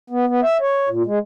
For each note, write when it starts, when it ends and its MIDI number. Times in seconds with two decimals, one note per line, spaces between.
0.10 0.25 59
0.28 0.41 59
0.43 0.57 76
0.61 0.89 73
0.89 1.03 46
1.06 1.19 56